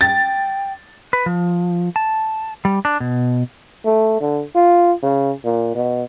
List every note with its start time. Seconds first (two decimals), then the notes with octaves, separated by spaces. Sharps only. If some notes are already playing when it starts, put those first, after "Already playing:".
0.01 G5 A6
1.13 B4
1.26 F3
1.96 A5
2.65 G3
2.85 D4
3.00 B2
3.85 A3
4.20 D3
4.55 F4
5.02 C#3
5.44 A#2
5.75 B2